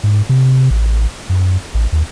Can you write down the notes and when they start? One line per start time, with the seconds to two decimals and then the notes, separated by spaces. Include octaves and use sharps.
0.04 G#2
0.29 C3
0.70 A1
1.30 F#2
1.75 A1
1.93 D#2